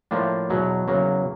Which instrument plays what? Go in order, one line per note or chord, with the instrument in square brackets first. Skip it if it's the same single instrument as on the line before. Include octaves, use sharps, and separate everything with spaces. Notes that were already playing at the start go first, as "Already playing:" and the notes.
[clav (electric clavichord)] A2 F3 A#3 D4
E2 B2 F#3
E2 C#3 F#3 A#3